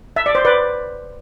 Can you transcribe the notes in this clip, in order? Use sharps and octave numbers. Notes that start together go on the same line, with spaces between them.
E5
D5
C5
B4 D5